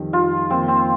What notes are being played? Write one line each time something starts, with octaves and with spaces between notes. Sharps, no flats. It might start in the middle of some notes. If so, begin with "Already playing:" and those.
Already playing: F2 D#3 G3
F4
F2 D#3 A#3 C4
C4